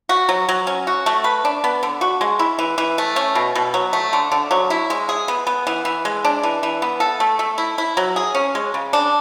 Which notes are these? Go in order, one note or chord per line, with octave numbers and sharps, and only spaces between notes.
F#4
F#3
F#3
C#4
F#4
A3
B4
D4
B3
D3
F#4
G#3
E4
E3
E3
A3
C#4
B2
B2
F#3
A3
D3
D3
F#3
E4
G#3
G#4
B3
B3
E3
E3
G#3
D4
E3
E3
B3
A4
A3
A3
E4
E4
F#3
G#4
C#4
G#3
C#3
D4